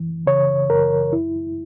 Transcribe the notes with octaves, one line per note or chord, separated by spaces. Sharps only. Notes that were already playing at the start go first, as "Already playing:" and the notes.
Already playing: F#2 E3
C#3 C#5
F#2 A#4
E4